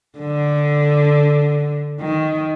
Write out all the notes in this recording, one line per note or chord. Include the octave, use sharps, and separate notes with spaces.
D3
D#3